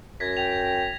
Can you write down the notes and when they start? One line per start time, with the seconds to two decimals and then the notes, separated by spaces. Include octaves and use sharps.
0.20 F#2 G#6 A#6 B6
0.37 G5 F7